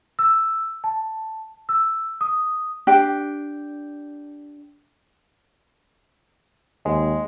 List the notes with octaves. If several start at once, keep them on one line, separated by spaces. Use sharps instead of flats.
E6
A5
E6
D#6
D4 G4
D#2 G#3